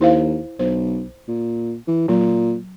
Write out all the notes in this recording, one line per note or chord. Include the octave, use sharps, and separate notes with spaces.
D#2 E4 C5 F5
B1 C5
A#2
E3
A#2 F#3